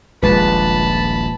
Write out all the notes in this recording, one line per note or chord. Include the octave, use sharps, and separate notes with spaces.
D#1 A#1 G#3 F4 B4 A5 B5